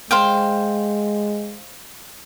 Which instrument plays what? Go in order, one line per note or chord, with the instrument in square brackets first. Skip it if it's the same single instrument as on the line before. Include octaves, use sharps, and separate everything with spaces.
[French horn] G#3 [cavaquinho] C5 F5 G5